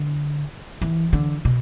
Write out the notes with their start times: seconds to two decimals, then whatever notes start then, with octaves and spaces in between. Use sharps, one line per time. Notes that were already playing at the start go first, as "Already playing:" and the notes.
Already playing: D3
0.82 E3
1.13 D3
1.45 B2